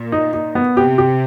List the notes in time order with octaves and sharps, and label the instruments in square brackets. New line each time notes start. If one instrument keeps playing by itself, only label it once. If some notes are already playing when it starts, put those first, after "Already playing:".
Already playing: [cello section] A#2
[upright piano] D#4
D#4
B3
[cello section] C3 [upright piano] G4
[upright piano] G4